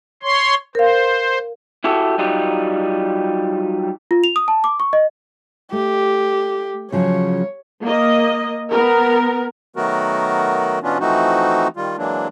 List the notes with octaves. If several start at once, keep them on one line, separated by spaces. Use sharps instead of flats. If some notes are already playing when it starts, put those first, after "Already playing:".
C#5 C6
A#4 C5 F5
E4 F#4 G4 A4
F#3 G3 D#4 F4 G4
F4
F7
D#6
A5
D6
C#6
D#5
A3 G4
C#3 F3 F#3 C#5
A#3 D#5
B3 A#4
D#3 F#3 A3 B3 F#4 A#4
B2 E3 B3 C#4 D4 F4
E3 F3 A3 C4 D#4 F#4
D#3 G3 F4
E3 F#3 G#3 A#3 D4